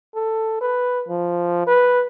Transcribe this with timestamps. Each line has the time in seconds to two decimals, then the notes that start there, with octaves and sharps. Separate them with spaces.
0.15 A4
0.61 B4
1.09 F3
1.67 B4